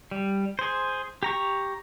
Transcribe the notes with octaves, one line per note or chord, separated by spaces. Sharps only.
G3
G#4 C5
G4 A#5 C#6